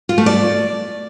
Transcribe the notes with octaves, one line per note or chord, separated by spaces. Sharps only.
F4
A3
D5